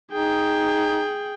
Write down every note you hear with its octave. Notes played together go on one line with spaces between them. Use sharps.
D#4 G#4 G5